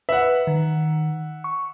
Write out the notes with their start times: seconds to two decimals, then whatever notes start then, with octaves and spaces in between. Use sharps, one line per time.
0.09 B4 E5 F#5
0.47 D#3
1.44 C#6